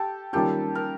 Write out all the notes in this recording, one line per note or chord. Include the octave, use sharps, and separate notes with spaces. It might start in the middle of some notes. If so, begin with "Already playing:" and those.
Already playing: G4 A4
D#3 G3 A#3 C#4 F4 G4 A4
A#4